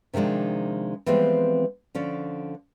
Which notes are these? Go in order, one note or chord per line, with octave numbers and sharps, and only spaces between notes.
C3 D#3 F3 G#3 D4
E3 F3 G3 G#3 B3 C4
D3 F3 C#4 D5